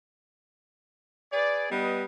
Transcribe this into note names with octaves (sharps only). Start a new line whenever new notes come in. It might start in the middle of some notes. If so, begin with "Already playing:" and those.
G#4 B4 D5
G3 B3 B4 D#5